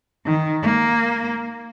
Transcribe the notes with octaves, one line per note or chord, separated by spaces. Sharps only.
D#3
A#3